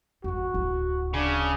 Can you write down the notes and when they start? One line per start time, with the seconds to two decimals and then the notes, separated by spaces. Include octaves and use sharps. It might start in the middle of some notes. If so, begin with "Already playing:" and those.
0.24 G#1 F2 F#4
0.54 D1 E4
1.14 C#3 D4